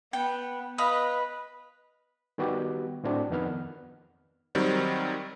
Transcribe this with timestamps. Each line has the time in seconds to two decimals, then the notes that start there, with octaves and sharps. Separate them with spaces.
0.13 B3 G5
0.78 B4 D#5 F5 B5
2.38 D#3 G3 B3 F#4 G4
3.04 A2 C4 D4 F#4
3.30 F2 D#3 B3 F#5 F6
4.55 D#3 F#3 G3 C4